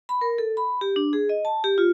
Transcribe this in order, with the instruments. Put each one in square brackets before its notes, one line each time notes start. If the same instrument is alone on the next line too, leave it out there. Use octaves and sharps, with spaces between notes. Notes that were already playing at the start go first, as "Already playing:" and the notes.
[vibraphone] B5
A#4
A4
B5
G4
D4
G#4
D#5
A5
G4
F4